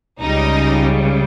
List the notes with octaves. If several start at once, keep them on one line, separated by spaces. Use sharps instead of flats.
C#2 C#3 G3 D#4